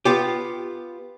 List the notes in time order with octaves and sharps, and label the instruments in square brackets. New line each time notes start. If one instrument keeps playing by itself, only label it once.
[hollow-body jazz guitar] B3 F4 G4